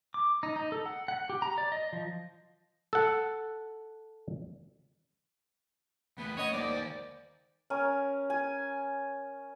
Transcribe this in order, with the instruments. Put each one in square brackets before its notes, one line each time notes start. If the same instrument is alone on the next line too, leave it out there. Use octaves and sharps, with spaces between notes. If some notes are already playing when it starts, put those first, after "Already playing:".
[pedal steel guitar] D6
D#4
D#4
A4
F#5
F#5
G4
A#5
D5
D#5
F3
[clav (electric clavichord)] A4 F#5
[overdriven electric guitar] E2 A3 [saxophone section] B3
[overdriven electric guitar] C#4 F#5 [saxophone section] C#5 D#5
[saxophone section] D#2 D5 [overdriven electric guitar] A#3 C5
[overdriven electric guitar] D#3 C5
[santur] C#4 A#4 G#5
G#5